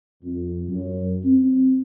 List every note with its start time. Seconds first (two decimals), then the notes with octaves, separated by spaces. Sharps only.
0.23 F2
0.69 F#2
1.25 C4